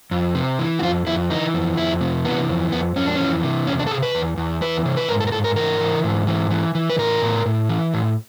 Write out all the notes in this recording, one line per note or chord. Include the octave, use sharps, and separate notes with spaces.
F2
C3
E3
F#4
F2 F4
F2 E4
E3 D#4
F2
F2 E4
C3
E3 B3
F2
F2 B3
F2 C#4
D4
E3 C#4
C3
E2 C#4
D4
A4
C3 G#4
B4
E2
E2
E3 B4
C3
B4
G#2 A#4
A4
A#4
G#2 A4
A#4
E3 A#4
E3
G#2
E3
E3
E3
B4
A2 A#4
A2
A2
E3
A2